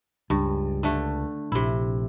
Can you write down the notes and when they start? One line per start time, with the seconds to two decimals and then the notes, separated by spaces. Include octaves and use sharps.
0.30 C#2 G2
0.83 D3 A3
1.52 A#1 C3 E4